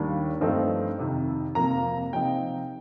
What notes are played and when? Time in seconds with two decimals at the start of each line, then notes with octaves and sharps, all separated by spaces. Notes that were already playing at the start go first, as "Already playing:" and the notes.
Already playing: D#2 D#3 G3 A#3 D4
0.41 G2 F3 A3 C4 D#4
0.98 F2 C3 D#3
1.55 F2 C3 F3 A#3 A#5
2.13 C3 F3 C4 D#4 G5